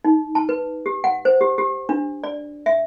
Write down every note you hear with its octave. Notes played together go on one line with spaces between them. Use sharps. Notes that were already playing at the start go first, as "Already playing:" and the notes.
D#4
A5
B4
G4
F#5
C5
G4
G4
D4
D5
E5